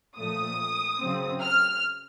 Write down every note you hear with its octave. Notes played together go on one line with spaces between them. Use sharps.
A#2 F3 A3 D#6
C#3 F#3 C4
F6